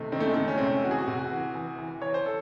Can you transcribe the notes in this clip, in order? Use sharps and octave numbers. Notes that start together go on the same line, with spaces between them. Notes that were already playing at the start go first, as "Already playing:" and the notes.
Already playing: C3 D#3 A3
D#3 C4
A3
G#3
D#3 A3
C#4
C3 C4
C#4
E3 F#4
G#4
F#4
C3
F#4
E3
E3
E3
E3 C#5
C5
A4